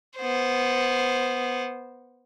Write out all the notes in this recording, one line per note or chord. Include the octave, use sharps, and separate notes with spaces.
B3 C5